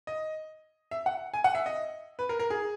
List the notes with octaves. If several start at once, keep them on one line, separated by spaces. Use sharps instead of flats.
D#5
E5
F#5
G#5
F#5
E5
D#5
B4
A#4
A#4
G#4